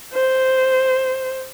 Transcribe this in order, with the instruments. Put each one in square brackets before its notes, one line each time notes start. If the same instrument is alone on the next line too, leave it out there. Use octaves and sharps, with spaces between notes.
[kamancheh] C5